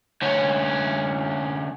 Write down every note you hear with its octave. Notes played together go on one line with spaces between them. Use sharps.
D2 C#4